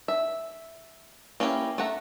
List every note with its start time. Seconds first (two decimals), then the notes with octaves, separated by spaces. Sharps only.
0.08 E5
1.40 A#3 C#4 E4 G4 B4
1.78 A3 E5 F#5 A#5